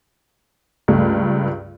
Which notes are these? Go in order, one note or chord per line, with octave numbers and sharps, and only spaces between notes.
C#2 G2 A3